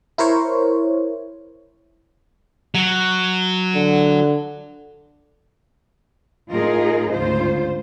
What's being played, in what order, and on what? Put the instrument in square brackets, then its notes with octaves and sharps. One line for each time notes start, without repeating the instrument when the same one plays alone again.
[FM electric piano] E4 A#4 C5 C#5
[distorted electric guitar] F#3
[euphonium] D3
[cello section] A2 D#4 F4 G#4 A#4 D#5
D2 G#2 C#3 F4 C5